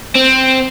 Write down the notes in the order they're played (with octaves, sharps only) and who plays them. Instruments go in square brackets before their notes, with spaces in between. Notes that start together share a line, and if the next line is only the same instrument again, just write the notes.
[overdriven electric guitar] C4